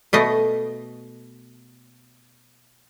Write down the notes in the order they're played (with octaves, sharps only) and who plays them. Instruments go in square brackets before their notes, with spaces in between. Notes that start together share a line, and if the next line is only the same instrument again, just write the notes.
[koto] B2 A3 D#5